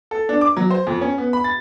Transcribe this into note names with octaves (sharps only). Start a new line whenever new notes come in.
A4
D4
D6
F#3
C5
F2
C#4
B3
B5
A6